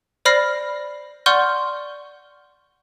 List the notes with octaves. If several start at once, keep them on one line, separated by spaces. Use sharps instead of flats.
C5 D5 B5 F6 A#6 C7
D5 F#5 C6 C#6 F6 G6